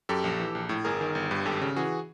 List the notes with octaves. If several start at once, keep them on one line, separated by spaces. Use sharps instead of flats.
F#2 G4 A4
A#1
E3
A#1
A2
G1 G#4 A#4
D#3
G1
G2
G#1 G4 A4
C#3
E3 F#4 G#4